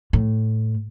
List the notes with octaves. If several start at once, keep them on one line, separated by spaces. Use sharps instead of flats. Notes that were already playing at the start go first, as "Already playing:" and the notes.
A2